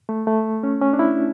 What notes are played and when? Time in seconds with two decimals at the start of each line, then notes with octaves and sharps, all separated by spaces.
0.09 A3
0.27 A3
0.63 C#4
0.81 C#4
0.93 D4
0.99 E4